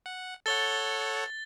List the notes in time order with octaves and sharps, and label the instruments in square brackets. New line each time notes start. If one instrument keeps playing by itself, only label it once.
[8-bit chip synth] F#5
[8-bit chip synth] A4 C#5 F#5 [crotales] A6 G7